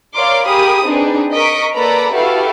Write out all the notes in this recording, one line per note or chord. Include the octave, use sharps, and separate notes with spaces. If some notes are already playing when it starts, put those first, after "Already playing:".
A#4 C#5 D5 F5 C6 D6
G4 G#4 A#4 B5 D#6
C4 D4 D#4 G#4 B4
A#4 D#5 C#6 B6 D7
A#3 A4 B4 D5 A#5 B5
E4 F#4 G4 A4 B4 F5